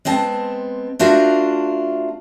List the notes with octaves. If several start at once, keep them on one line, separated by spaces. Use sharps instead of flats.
G#3 B3 C4 A5
A3 D4 F4 F#4 A#4